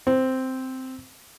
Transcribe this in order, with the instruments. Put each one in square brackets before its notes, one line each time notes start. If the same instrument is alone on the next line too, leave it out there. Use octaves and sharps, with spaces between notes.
[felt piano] C4